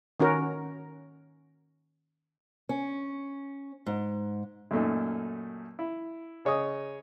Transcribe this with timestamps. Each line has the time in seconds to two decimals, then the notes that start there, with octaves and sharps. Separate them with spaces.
0.20 D#3 C#4 F#4 A#4
2.69 C#4
3.86 G#2
4.71 F#2 A#2 A3 D#4
5.79 E4
6.45 C#3 C#5 D#5 D#6